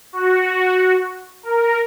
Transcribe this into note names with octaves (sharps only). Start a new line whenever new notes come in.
F#4
A#4